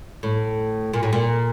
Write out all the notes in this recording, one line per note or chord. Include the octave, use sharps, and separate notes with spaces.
A2
A#2
A2
A#2